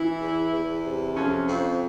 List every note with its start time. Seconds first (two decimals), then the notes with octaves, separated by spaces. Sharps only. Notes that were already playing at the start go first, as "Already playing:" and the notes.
Already playing: E3 E4
0.21 E2
0.52 E2
0.84 C3
1.15 F2 C#4
1.46 F2 C4